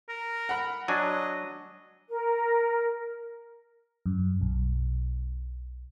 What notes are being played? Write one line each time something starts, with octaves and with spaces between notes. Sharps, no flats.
A#4
F#5 B5
F#3 D4 D#5 G#5
A#4
F#2
B1